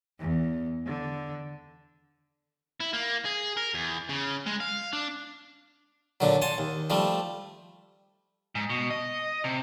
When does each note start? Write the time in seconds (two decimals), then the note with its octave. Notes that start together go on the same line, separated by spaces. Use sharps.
0.19 E2
0.85 D3
2.81 E4
2.93 A#3
3.25 G#4
3.57 A#4
3.74 E2
4.09 C#3
4.46 G#3
4.60 F5
4.93 D4
6.20 A#2 D3 F#3
6.42 F#5 G#5 A5 C6
6.58 D#2
6.90 F3 G3 A3
8.55 G#2
8.70 B2
8.91 D#5
9.44 C3